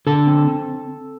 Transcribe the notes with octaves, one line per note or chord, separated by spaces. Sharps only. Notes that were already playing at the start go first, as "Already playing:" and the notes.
D3 A4 A5
C4
C4